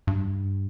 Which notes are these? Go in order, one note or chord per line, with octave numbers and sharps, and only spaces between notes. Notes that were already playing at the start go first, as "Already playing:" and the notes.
G2